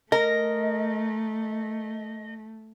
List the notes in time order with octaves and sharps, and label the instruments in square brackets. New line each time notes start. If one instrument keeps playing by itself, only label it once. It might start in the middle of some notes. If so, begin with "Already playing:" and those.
[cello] A3 [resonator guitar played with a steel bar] A#4 [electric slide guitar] D#5